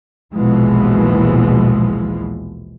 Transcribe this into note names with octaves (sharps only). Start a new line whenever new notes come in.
A#1 D#2 B2 E3 F3 G#3